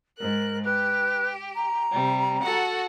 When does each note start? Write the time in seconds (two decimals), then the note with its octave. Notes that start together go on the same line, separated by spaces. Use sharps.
0.18 G#2 A#4 F#6
0.64 G4 B4
1.55 A#5
1.90 C3 G3
2.43 F#4 A4 F#5